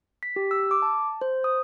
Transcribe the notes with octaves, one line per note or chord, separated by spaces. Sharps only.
B6
G4
E6
D6
A5
C5
D#6